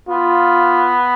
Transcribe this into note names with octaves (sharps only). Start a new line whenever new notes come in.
B3 F4